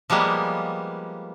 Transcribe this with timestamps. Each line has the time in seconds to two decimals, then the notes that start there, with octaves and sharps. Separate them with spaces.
0.10 F3 G3 G#3 A#3 B3